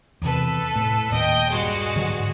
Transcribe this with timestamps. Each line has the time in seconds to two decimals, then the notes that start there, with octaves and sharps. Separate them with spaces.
0.22 E2 C3 A4 B4
0.76 A2
1.12 D#1 A#2 D#5 G5
1.49 G2 G#3 F#4
1.95 G#2 D3 F#3